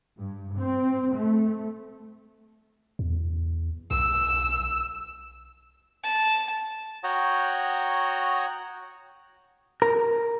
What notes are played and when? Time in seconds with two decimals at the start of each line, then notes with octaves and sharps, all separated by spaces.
0.20 G2
0.58 C4
1.16 A3
2.99 E2
3.91 B1 E6
6.04 A5
7.04 F#4 C#5 F#5 G5 A#5 D#6
9.82 A#4